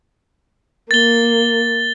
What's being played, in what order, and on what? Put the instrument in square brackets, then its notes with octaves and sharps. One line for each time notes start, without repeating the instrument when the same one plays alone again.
[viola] A#3 [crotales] A6 G7